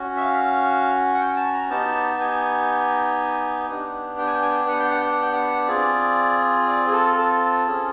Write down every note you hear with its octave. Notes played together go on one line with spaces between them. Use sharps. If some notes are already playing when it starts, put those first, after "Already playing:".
Already playing: C#4 F#4
E5
F5
F#5
G5
A5
A#5
B3 D#4 G4 A5
A5
G#5
B3 D4 G4
G5
G#5
G5
G#5
G5
F#5
G5
F#5
G5
F#5
G5
F#5
C4 F4 G#4 D5
D5
G#4
A4
A4
C#4 F4 G#4